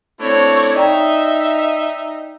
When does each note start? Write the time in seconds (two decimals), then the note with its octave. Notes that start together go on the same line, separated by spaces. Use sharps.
0.20 A3 C4 D4 E4 C#5
0.75 D#4 D5 E5 G5 A#5